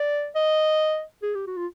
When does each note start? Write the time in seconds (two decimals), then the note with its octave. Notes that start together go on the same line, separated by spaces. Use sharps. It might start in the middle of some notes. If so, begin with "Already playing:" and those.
Already playing: D5
0.35 D#5
1.23 G#4
1.35 G4
1.47 F#4
1.57 F4